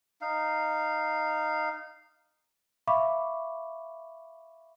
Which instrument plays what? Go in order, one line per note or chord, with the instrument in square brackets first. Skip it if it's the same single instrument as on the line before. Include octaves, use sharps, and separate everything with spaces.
[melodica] D#4 F5
[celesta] E5 F5 B5 C#6 D6